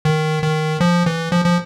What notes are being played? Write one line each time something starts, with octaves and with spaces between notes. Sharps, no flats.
D#3
D#3
F3
E3
F3
F3